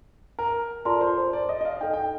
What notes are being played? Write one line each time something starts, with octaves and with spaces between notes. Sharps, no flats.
A#4
F4 A4 A#4 D5 A5 C6
C5
C5
D5
D#5
D#5
F5
D#4 A4 D#5 G5
G5